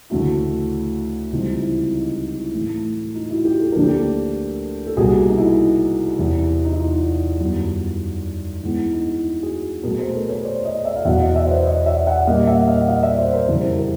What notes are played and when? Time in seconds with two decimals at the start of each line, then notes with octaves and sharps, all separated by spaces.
0.10 D2 C#3 E3 A3 D4 E4 F#4
1.32 C#2 C3 E3 G3 C4 D#4 F4
1.62 E4
1.93 D#4
2.13 E4
2.33 E4
2.53 A2 E3 A3
3.15 D#4 F4
3.30 E4 F#4
3.45 F4 G4
3.60 A4
3.72 D2 D3 F3 A#3 D4 A#4
3.83 G4 A4
4.87 A4
4.97 C2 B2 G3 A#3 F#4 G#4
5.29 D#4
5.38 E4
6.19 E2 C3 E3
6.65 D#4
6.72 E4
6.79 D#4 F4
7.40 F#2 D#3 G3 B3
8.62 G#2 E3 G#3 B3 E4
8.78 E4
8.93 D#4
9.08 E4
9.43 F#4 G#4
9.84 B2 F#3 A3 G#4 A#4
9.99 A#4 C5
10.14 A4 B4
10.30 B4 C#5
10.45 C5 D5
10.65 C#5 D#5
10.85 D5 E5
10.96 F5
11.05 E2 B2 F#3 E5 F#5
11.20 D#5 F5
11.36 D5 E5
11.47 C5
11.51 B4 C#5
11.66 C#5 D#5
11.86 D5 E5
12.07 E5 F#5
12.27 A#2 G3 A#3 C#4 D#5 F5
12.47 E5 F#5
12.67 D#5 F5
12.81 F#5
12.88 D#5 F5
13.03 D5 E5
13.18 C5 D5
13.33 A#4 C5
13.48 F2 C#3 E3 G3 A#4 C5
13.79 G#4 A#4